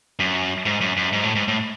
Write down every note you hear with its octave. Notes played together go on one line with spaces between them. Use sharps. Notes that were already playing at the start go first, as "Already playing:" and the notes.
F#2
G#2
F#2
F#2
G#2
A2
G#2
A2